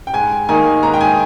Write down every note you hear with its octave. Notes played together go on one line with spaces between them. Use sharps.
G5
G#2 G#5
D#3 A#3 D#4 G#5
G#2 A#5
G5
G#5